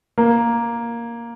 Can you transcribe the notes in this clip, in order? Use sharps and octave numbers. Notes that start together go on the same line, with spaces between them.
A#3